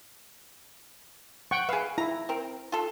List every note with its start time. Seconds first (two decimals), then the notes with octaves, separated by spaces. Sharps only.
1.51 F#5 G5 C#6
1.69 G#4 B4 E5 F5
1.98 E4 A#5
2.29 C4 A#4
2.72 F4 A4